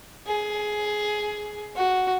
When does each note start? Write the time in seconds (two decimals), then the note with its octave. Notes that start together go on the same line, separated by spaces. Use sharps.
0.27 G#4
1.76 F#4